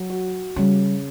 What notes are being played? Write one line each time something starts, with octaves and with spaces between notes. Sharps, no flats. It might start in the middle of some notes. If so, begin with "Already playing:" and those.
Already playing: F#3
F#4
C#3 G3